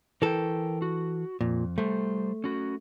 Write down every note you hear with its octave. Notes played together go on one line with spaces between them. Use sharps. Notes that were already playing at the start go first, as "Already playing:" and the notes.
E3 A4 A#4 G5
F#4
F2 A#2
G3 A3 C5
C#4 F#4